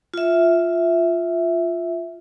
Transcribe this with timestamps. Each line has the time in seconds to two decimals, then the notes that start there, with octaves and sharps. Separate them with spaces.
0.14 F4 E5